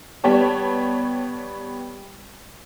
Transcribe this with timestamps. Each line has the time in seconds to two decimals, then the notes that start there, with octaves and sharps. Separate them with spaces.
0.24 G3 B3 G4 C#5 A5